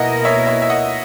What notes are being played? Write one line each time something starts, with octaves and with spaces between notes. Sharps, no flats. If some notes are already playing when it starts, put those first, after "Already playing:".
Already playing: B2 A#3 E4 A#4 D#5 F#5
C#5 E5
C#5 E5
E5
D#5 F#5